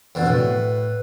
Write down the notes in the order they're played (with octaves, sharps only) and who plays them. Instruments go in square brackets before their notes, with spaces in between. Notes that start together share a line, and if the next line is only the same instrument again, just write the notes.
[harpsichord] F2 B2 D3 [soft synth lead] E3
[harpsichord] A2 [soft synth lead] B4